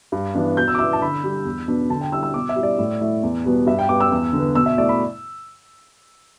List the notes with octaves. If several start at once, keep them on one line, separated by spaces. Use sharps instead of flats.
G2
E3 B3 D4
B2 G6
E6
D6
B3 E4 E6
A5
D3 B5
G3 D4
E2
B2 B3 D4
D3 A5
G5
G3 E4 E6
E6
B2 D6
E5
G3 E4
D5
A2
A3 E4
E2
B2 G3 B3
G2 E5
G5
G3 B3 D6
E6
E2
D3
B3
B2 E6
E5
A3 E4 D5
B5